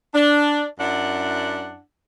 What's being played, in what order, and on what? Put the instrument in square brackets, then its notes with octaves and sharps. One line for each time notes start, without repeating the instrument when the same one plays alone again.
[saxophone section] D4
F#2 D4 E4 F#5